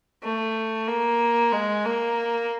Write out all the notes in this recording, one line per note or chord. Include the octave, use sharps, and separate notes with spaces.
A3
A#3
G#3
A#3